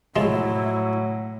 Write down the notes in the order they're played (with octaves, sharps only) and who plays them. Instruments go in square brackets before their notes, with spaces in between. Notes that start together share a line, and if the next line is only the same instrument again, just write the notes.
[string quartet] A2 [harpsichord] F3 G#3 F4 [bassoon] F#3 [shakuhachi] E4